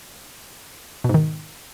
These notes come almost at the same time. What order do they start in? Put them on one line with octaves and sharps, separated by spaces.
B2 G#2 D#3